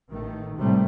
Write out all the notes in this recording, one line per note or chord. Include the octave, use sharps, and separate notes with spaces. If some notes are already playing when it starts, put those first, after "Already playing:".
A1 D#3 A3
A2 C3 G3 A3